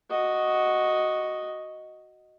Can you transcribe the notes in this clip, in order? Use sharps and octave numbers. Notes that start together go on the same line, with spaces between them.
F#4 D#5